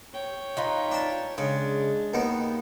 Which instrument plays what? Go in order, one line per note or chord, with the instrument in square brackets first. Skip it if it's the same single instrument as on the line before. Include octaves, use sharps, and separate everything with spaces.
[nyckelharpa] C#5 G5
[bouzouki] D#4 F4 B4
[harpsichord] D4 A5
[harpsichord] C#3 [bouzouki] G#3 [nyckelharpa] D4
[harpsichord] D#2 D#3 B3